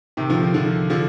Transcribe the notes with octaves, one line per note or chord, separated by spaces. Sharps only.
C3 D#3
D3 F3
D#3
D3 F3
D3 F3